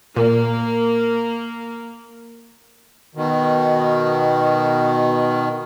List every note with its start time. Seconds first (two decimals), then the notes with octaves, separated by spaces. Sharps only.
0.16 A#2 A#3
3.15 B2 D#3